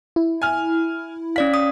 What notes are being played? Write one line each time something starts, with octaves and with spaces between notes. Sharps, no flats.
E4
G#5 F6
C#4 D5 F5 B6
D#6